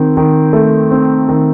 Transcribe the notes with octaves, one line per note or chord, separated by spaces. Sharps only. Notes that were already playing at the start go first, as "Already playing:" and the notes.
Already playing: D#3 C4
D#3
A3
C4
D#3